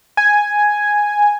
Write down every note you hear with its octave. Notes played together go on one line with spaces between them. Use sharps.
G#5